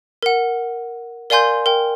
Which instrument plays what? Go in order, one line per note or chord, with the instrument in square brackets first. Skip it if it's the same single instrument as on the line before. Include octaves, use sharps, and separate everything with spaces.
[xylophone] A#4 F#5
A#4 D5 F5 G#5 C6 G6
A#4 G5